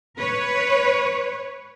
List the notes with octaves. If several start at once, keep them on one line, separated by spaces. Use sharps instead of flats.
B4 C#5